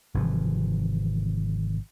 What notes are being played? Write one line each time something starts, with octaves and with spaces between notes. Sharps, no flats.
G#1 C3 E3 F3